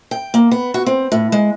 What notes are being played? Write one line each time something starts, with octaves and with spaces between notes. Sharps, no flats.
G5
A#3
B3
F#4
C4
A2
G#3